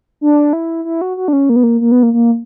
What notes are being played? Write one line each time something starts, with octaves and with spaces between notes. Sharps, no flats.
D4
E4
E4
F#4
F#4
D4
C#4
A#3
B3
A#3
A#3
B3
A#3
A#3